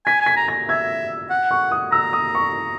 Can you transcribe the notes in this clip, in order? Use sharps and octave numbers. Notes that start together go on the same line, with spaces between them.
G#5 B6
G#5 B6
A#5
A#6
E5 G#6
F#5
C#6
D#6
A#5 E6
D#6
C#6